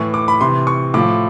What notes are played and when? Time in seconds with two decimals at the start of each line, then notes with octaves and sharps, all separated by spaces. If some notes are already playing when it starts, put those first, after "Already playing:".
Already playing: A2 E3 C#6
0.14 D6
0.28 B5
0.41 C3 E3 C6
0.67 C#6
0.94 A2 F3 D6